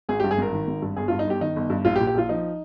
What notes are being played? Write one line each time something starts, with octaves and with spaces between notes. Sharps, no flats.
G#1 G#4
G4
G2
G#4
G#1 A#4
D#3
G#1
G2
G1 G#4
F4
G2
D#4
G1 G4
D#3 D#4
G1
G2
A#1 F4
G4
A#2
G4
A#1 F4
F3 D#4